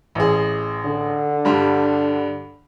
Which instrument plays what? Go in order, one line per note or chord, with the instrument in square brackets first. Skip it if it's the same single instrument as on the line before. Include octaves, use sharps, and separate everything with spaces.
[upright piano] A1 G#4
[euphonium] D3
[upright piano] G2 G3